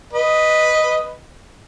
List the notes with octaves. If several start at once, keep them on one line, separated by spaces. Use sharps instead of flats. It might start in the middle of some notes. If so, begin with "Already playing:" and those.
B4 D#5